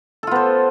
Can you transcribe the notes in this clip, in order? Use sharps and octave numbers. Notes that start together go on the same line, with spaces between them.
B3 F4 A4 C5